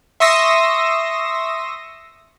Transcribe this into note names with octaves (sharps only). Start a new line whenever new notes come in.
E5 C6 C#6 D#6 E6 A#6